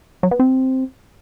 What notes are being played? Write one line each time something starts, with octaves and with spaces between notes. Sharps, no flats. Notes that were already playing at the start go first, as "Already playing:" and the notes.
F#3
B3
C4